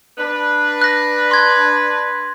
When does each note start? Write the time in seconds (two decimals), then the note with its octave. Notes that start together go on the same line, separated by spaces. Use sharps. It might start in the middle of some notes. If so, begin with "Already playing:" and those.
0.18 D4 B4
0.82 F#6 A#6
1.31 C6 G#6